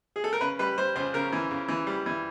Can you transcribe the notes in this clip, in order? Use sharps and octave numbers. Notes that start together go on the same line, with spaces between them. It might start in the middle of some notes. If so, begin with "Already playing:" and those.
G#4
A4
A#4
C#3 B4
G3 B4
G3 C5
C#2 C5
C#3 A#4
E3
C#3
E3
G3
E3